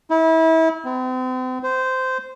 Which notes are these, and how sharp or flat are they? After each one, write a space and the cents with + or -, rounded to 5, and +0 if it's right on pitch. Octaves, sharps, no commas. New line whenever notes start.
E4 -30
C4 -40
C5 -15